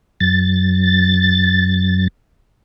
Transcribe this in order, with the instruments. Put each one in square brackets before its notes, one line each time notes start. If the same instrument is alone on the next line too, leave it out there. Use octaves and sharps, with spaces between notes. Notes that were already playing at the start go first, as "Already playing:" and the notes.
[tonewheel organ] F#2 A6